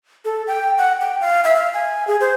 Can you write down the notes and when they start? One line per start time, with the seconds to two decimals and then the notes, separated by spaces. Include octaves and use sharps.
0.25 A4
0.47 G5
0.78 F#5
1.01 G5
1.21 F5
1.44 E5
1.56 F5
1.74 G#5
2.07 G#4
2.21 C5